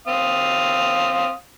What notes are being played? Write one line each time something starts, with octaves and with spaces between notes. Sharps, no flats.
C4 F5 D#6